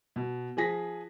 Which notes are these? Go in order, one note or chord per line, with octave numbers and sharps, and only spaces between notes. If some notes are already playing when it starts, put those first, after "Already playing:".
B2
F3 G#4 A#6 B6